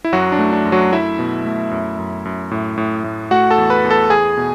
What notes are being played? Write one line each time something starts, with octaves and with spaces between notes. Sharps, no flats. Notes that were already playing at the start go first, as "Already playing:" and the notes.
E4
F#2 F#3 F#4
D4
A3
D4
F#2
F#3 F#4
A3 E4 E5
B2
A3
F#2
F#2
F#2
A2
A2
A2
A3 F#4 F#5
A4 A5
E2
B4 B5
E2
A4 A5
E2 G#4 G#5
B2